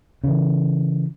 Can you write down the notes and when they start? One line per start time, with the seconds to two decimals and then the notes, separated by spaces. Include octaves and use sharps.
0.24 C#3 E3